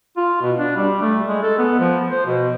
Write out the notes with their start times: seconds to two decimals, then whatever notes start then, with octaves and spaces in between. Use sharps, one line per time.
0.17 F4
0.42 B2
0.58 D4
0.76 G3
1.02 A3
1.28 G#3
1.43 A4
1.58 B3
1.79 F3
2.11 C5
2.26 B2